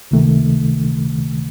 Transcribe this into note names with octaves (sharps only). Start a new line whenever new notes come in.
C#2 C3 D#3 A3